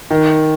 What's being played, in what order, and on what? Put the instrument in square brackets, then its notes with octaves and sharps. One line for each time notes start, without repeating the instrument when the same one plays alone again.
[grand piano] D#3